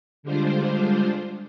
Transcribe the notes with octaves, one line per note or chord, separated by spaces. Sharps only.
D3 G3 G#3 D4 F4 C5